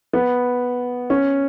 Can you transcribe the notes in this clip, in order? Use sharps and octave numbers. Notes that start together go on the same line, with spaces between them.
B3
C#4